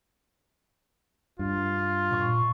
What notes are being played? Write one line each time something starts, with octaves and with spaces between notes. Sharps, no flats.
G2 F4
A#2 D#5 C#6 E6